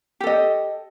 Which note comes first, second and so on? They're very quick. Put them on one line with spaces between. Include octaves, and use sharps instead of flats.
G4 A4 D#5